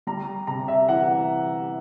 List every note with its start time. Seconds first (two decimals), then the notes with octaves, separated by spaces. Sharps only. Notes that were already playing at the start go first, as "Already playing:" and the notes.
0.07 G3 A#5
0.47 C3 A#5
0.68 E5
0.89 E3 F#5